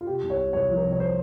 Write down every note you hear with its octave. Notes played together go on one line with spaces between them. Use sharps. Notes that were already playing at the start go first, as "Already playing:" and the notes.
F4
C3 G4
C2
C#5
C2
C2 C#5
F3
A#4
C3
C#5
C5